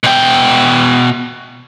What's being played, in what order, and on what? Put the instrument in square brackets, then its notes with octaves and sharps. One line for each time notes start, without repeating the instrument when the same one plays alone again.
[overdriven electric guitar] B2 G5